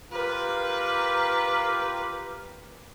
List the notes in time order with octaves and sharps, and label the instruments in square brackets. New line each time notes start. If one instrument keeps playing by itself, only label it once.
[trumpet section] F4 G4 A#4 [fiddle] B4